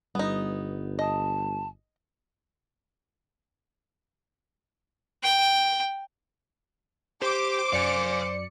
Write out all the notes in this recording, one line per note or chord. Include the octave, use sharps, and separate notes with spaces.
G1 G3 B3 D#4
D#5 A5
G5
G4 C5 D6
F#2 D5 F5 G#5 C#7